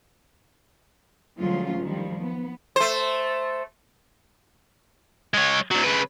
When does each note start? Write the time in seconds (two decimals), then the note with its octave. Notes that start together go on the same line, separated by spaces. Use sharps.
1.40 D2 F3 F#3 G#3 C#4 F4
1.80 D#3 F3 G3
2.22 B3
2.76 A3 C5
5.34 G#3 C#5
5.71 D2 F#3
5.84 C#3 B4